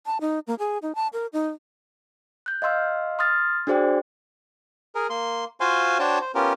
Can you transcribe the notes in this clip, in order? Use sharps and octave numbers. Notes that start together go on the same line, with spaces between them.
A5
D#4
A#3
G#4
D#4
A5
A#4
D#4
F#6 G6
D#5 F5 C6 E6 F6
C6 D#6 F6 A6
D4 F#4 G#4 C5 D5 G5
G#4 A#4
A#3 C6
F4 F#4 C5 F5 G#5 C6
D4 F#4 C5 C#5 G5 A5
C5
B3 C#4 F4 G4 A#4